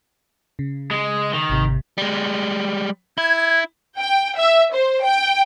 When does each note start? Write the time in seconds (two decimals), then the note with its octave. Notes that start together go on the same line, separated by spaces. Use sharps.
0.59 C#3
0.91 G#3
1.33 D#3
1.50 G#1 C3
1.98 G3 G#3
3.18 E4 G#6
3.98 G5
4.36 E5
4.72 C5
5.03 G5